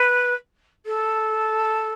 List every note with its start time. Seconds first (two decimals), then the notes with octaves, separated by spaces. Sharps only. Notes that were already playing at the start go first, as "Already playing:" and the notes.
Already playing: B4
0.86 A4